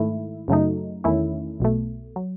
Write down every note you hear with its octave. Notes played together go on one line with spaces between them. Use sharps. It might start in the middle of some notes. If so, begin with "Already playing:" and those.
Already playing: G#2 D#3 A3 E4
F#2 C#3 F#3 A3 D#4
E2 D#3 A3 C#4 E4
B1 B2 A3
F#3